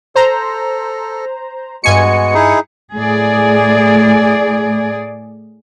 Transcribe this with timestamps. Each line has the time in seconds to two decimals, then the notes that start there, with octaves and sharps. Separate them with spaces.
0.15 A4 C5 A#5
1.84 G2 G#3 B3 F#4 G#5 C#7
2.34 D#4 E4 G#4
2.95 A2 G#4 D5